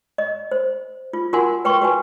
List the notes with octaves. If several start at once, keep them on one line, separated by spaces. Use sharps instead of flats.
D#5
C5
F4
F4 F#4 A#4 F#5 G#5 C6
B4 G5 C6 C#6
F#4 B4 G#5